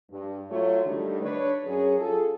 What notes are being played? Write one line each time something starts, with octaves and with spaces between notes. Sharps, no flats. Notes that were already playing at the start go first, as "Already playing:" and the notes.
G2
F#3 A3 F4 C#5
D3 D#3 G3 A3
D4 B4 C#5
F#2 F#3 C#4 G#4
F4 G#4 A4